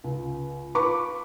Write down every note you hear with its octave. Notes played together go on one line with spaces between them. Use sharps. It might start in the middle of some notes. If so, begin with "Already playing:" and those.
C#2
F4 B4 B5 C#6 D6